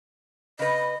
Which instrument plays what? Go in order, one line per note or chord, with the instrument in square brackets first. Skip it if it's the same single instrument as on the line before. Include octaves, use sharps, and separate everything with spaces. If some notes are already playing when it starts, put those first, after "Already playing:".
[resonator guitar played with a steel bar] C#3 B4 [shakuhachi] D#5